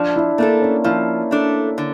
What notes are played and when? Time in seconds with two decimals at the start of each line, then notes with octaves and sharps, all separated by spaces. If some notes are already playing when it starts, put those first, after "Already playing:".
Already playing: F3 D4
0.16 E4
0.38 A3 A#3 D4 A4
0.62 C#4
0.84 F3 E4
1.31 A3 D4 A4
1.78 D3